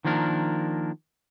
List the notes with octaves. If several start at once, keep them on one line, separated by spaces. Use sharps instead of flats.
D#3 F3 A#3 D4 A#4